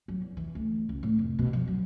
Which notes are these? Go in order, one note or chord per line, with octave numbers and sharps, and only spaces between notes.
F#3
E2
E3
D2
C#2
A2
F1
B2
F3
F#3